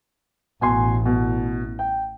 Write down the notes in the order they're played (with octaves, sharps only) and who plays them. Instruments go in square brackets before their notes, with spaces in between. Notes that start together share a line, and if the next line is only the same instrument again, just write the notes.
[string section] A1 [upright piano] B2 G#5 C6
[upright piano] B2
G5